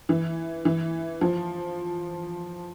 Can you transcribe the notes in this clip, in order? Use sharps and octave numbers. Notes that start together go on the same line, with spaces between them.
E3
E3
F3